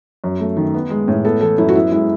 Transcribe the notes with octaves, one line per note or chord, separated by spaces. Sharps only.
F#2
A3
D#3
B3
G#3
A2
B3 A4
E3 A4
F#2 E4
F#4
B3 E4
G#3 E4